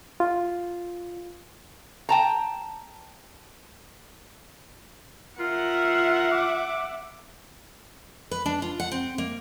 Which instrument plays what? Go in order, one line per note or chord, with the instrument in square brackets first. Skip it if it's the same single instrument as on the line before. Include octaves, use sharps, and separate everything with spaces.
[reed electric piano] F4
[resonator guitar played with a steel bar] G5 A5 A#5
[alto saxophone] F4 [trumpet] A#4 [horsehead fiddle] E5 F#5
[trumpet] D6
[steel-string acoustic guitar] B4
D4
F4
F#5
C4
A#3